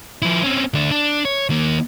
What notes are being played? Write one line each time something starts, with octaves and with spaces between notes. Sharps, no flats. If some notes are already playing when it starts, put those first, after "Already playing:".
F3 E4
C4 C#4
D2 D4
D4
C#5
D#3 A#3